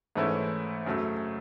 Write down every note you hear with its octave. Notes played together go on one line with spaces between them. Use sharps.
G#2 E3 A3 C#4 E4
F#2 C#3 F#3 A3